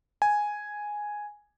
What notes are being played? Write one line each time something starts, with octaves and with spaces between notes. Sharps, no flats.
G#5